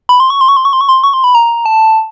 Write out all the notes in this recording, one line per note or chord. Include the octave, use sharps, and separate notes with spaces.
B5
C6
C#6
C6
C#6
C6
C#6
C6
C#6
C6
C#6
C6
B5
A#5
A5